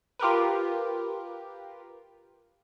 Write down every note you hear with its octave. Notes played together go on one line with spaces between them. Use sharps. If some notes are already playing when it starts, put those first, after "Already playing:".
F4 G4 A#4 B4